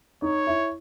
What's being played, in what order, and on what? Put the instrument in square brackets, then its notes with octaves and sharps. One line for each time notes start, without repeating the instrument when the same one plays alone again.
[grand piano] D#4 [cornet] C#5
[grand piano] E4